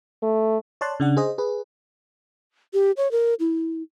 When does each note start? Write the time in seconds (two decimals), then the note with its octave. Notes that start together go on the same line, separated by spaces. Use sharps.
0.23 A3
0.81 C#5 D5 A5 C6 F#6
1.00 C#3 D4 F#5
1.17 G#4 C5 D#5
1.38 G#4 B4
2.74 G4
2.97 C#5
3.11 A#4
3.40 E4